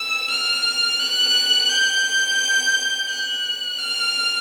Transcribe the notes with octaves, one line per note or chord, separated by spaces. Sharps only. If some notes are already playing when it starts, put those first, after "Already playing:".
Already playing: E6
F6
F#6
G6
F#6
F6